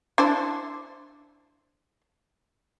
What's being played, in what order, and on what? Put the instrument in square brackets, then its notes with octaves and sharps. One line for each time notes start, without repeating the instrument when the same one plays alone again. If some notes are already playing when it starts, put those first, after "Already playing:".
[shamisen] D4 E4 C5